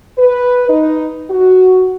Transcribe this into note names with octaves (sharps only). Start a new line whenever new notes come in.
B4
D#4
F#4